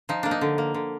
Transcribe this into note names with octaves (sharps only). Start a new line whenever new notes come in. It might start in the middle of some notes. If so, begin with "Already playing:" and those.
F3 D#4
A#3 D4
D#4
D3
A#3
D3